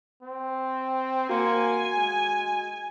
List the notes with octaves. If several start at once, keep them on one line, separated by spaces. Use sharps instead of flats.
C4
A#3 F#4 G#5 C6 C#7
G#3